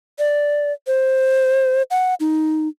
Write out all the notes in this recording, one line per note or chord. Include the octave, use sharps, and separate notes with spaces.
D5
C5
F#5
D#4